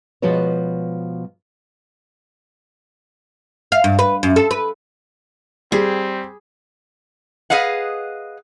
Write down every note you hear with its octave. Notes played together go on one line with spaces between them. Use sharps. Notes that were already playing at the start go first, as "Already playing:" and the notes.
B2 F3 G#3 F#4 B4 C#5
F5
G2
B4
F#2
A4
B4
G3 C4 G#4
G#4 B4 D#5 F5 F#5